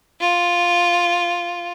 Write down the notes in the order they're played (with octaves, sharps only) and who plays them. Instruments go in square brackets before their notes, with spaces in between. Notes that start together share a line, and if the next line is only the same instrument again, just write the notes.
[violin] F4